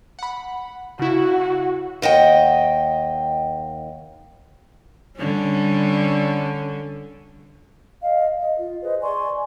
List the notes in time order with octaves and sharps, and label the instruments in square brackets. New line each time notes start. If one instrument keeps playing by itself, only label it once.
[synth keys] F#5 B5
[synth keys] C#3 E4 [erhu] F#4
[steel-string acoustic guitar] D#2 D#5 F#5 G5
[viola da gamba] D3 G3 C#4
[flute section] D#5 F5
D#5
F4
G#4 B4 C5 D#5
D5 G#5 C6 C#6